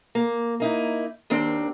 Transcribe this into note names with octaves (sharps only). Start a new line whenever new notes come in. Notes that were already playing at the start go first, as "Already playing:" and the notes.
A#3
A#3 D#4 E4
D#2 D#3 C4 D4